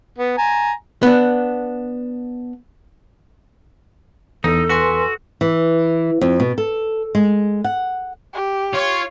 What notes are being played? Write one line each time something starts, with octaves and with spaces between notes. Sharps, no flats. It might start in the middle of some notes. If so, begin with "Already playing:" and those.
B3
G#5 A#5
B3 D4
E2 D#4 A4
F#4 B4 G#5 C6
E3
F2
B2
A4
G#3
F#5
G4
F4 C#5